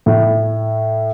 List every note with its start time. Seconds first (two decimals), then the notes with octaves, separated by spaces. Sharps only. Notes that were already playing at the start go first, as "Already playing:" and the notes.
0.06 A2